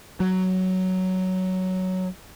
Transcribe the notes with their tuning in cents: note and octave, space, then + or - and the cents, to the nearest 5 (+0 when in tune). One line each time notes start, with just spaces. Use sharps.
F#3 +10